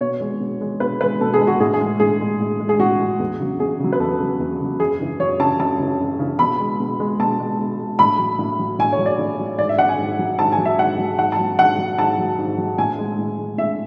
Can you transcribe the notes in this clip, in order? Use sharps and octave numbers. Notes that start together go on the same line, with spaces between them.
B2 C#5
G#3
B2
G#3
B2 B4
G#3 B4
B2 A4
G#4
G#3
F#4
A2 G#4
G#4
G#3
A2 G#4
G#3
A2
G#3
G#4
A2 F#4
G#3
E2
C#3 F#3
E2 G#4
C#3 F#3
B4
E2 A4
C#3 F#3
E2
C#3 F#3
F#2 G#4
C#3 E3
F#2 C#5
C#3 E3 A5
F#2 A5
C#3 E3
F#2
C#3 E3
B2 B5
G#3
B2
G#3
B2 A5
G#3
B2
G#3
A2 B5
F#3
A2
F#3
A2 G#5
C#5
F#3
D5
A2
F#3
G#2 D5
E5
F#3 F#5
G#5
G#2
F#3
G#2 A5
G#5
F#3
E5
G#2 F#5
F#3
G#2 F#5
A5
F#3
G#2 F#5
F#3
G#2 A5
F#3
G#2
F#3
A2 G#5
G#3
A2
G#3
A2 E5